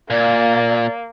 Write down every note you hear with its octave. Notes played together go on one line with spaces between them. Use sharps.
A#2 A#3 D5